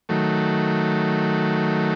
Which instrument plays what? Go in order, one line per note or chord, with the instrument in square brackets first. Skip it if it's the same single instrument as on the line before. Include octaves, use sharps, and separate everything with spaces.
[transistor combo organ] D#3 F#3 A3